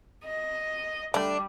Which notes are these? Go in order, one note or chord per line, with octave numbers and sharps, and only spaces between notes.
D#5
D3 G3 A3 D4